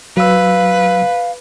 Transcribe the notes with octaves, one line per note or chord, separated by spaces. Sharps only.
F#3 B4 F5 E6